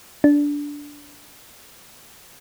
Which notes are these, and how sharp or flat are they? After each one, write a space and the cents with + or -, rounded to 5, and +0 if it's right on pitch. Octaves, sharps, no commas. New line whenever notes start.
D4 -15